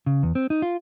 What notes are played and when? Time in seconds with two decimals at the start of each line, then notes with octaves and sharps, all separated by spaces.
0.06 C#3
0.23 E2
0.35 C4
0.50 D#4
0.62 F4